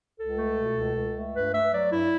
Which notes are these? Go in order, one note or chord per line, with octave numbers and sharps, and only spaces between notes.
C#2 A4
A3
B2
C#2
C#2
A3
G2 B4
A3 E5
F#3 D5
G2 E4